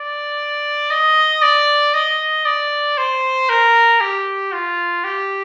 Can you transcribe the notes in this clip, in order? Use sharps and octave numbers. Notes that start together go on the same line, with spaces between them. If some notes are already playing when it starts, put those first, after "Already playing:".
Already playing: D5
D#5
D5
D#5
D5
C5
A#4
G4
F4
G4